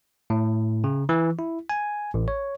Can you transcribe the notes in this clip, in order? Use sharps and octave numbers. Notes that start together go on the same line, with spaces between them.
A2
C#3
E3
E4
G#5
A1
C#5